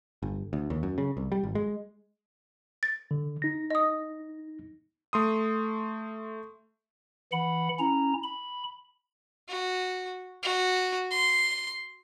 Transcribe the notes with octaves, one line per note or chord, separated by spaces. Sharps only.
G1
D2
D#2
F#2
C#3
C2
G3
G#1
G#3
A6
D3
D#4 A#6
D#5 D#6
A3 C6 D#6
E3 F#5 B5
C#4 E4 A#5
B5
F#4
F#4
C6